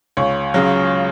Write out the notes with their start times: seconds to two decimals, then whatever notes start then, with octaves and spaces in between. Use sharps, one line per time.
0.17 C#2 C#5
0.54 C#3 F#3